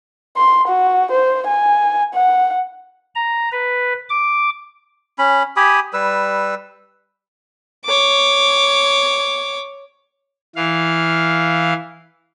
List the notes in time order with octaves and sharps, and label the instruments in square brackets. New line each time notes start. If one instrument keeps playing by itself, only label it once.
[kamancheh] C6
F#4
C5
G#5
F#5
[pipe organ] A#5
B4
D6
[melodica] C#4 B5
G4 G#5 B5 D#6
G3 B4 E6
[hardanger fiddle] C#5 D6
[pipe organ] E3 F5